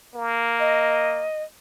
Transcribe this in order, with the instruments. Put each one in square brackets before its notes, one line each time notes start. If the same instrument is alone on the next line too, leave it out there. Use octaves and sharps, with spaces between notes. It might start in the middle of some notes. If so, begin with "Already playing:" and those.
[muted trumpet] A#3
[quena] D#5